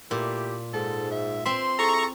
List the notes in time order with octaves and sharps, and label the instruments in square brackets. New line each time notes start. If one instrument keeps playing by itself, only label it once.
[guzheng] A#2 [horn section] A3 E4 G4
[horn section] G#2 [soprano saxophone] A4
[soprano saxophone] E5
[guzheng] C4 E5 [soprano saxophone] C6
[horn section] E4 G#4 A4 [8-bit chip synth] A#5 C#6